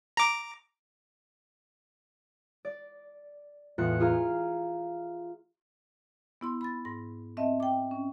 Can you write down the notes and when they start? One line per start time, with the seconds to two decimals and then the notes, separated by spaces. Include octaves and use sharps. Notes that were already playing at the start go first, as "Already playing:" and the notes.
0.17 A#5 D6
2.65 D5
3.78 E2 A2 F4 F#6 C#7
4.00 F4 G#4 F5 A#5
6.41 B3 E4 C6
6.61 B5 A6
6.85 G#2 A#6
7.37 C4 D#5 E5 A5
7.60 G5 D6
7.91 C#4